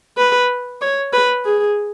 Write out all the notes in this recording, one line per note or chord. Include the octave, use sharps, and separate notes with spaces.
B4
C#5
B4
G#4